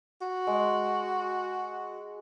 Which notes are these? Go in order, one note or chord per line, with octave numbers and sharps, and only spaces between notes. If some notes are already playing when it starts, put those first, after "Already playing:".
F#4
G#3